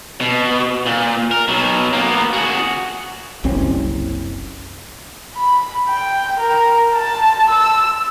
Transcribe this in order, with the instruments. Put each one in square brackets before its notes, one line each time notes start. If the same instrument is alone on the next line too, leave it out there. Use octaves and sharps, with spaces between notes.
[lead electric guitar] B2
A#2
A#4
B2 F#3
A#3 B3
F#4 G#4
[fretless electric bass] F#1 C2 C4 C#4
[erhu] B5
G5
A#4
A5
E6